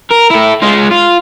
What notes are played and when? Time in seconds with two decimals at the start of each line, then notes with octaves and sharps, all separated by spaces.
0.11 A#4
0.30 E4 A4
0.62 G#3 F4
0.91 F4